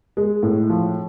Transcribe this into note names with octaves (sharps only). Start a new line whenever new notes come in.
G#3
A2
F3